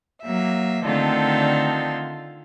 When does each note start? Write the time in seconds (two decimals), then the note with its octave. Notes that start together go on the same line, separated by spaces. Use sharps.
0.22 F#3 A#3 E5
0.85 D3 D#3 A3 C4 F4 A4